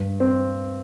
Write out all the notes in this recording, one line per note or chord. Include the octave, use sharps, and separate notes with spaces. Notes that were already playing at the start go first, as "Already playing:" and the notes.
Already playing: G2
C4